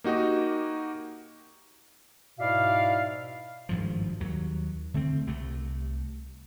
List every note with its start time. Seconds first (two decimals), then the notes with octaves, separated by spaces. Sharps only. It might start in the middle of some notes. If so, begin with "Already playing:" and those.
0.04 A#3 D#4 F#4 G4 D#5
2.39 G#2 B2 E4 D5 E5 F5
3.69 G#1 G2 F3
4.20 D#2 F#3
4.94 D3 A3 C4
5.27 C2 C3 A3